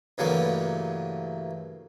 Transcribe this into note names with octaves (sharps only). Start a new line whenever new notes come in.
G2 C#3 E3 F#3 A3 A#3